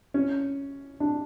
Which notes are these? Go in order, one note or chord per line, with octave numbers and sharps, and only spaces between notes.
C#4
D4